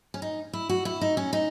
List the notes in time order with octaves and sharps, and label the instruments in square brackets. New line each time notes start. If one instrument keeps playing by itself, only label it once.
[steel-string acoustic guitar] C#4
D#4
E4
F#4
E4
D#4
C#4
D#4